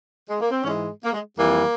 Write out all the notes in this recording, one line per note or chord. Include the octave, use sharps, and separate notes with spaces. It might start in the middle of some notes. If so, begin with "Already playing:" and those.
G#3
A#3
C4
G#2 E3 G#3 C#4
A#3
G#3
F2 E3 G3 A#3